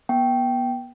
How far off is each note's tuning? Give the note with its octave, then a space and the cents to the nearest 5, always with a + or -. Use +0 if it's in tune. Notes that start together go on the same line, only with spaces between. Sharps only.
B3 -30 G5 -10